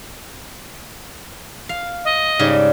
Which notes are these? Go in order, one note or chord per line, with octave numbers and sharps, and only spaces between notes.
F5
D#5
G#2 C#3 G3